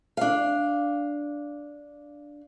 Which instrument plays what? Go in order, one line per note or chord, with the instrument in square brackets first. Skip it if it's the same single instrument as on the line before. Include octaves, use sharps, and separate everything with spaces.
[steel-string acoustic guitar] D4 F5